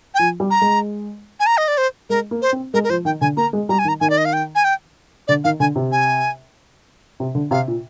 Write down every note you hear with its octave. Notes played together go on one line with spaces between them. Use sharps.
G5
F3 G#5
G3
A#5
G#3
G#5
A#5
D#5
D5
C5
G#3 A#4
A#3
C5
C4
G#3 A#4
A#4
F3 C5
D#3 G5
D3 G#5
A#3 A#5
G#3
G3 A#5
G#5
D#3
A#5
D#3 G#5
D5
D#5
F5
G5
G#5
G5
D3 D5
D#3 F5
D3 G#5
C3
G#5
C3
D3
C3 F5
A#2